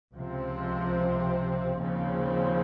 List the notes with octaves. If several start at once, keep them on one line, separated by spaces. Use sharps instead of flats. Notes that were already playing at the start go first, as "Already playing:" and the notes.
C#2 C3 F3 C4
D#2 C#3 F3 C4